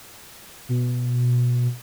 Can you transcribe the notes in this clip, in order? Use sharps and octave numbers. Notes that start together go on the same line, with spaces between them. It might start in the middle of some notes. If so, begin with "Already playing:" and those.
B2